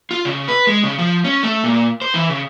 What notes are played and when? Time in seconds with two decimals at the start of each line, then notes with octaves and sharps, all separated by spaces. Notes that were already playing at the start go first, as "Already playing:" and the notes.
0.11 F4
0.25 C#3
0.48 B4
0.67 G#3
0.84 C#3
0.99 F3
1.24 C#4
1.43 A3
1.64 A#2
2.02 C5
2.14 E3
2.30 C#3